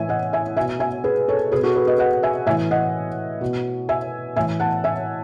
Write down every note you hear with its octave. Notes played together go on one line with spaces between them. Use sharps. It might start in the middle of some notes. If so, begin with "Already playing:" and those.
Already playing: A2 E3 E5 G#5
D#5 F#5
E5 G#5
B2 E5 G#5
E5 G#5
G#4 B4
A4 C#5
B2 G#4 B4
F#4 A4
G#4 B4
B4 D#5
D#5 F#5
E5 G#5
A2 E3 E5 G#5
D#5 F#5
B2
E5 G#5
A2 E3 E5 G#5
F#5 A5
E5 G#5